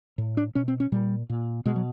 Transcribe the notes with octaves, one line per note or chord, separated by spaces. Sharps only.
A2
D4
B2 C#4
C4
C#4
A#2 G3
A#2
B2 G#3
F#3